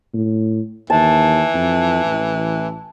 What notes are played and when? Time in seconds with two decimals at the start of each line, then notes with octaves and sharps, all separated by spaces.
0.14 A2
0.90 D#2 E3 A5
1.54 F2
2.05 A1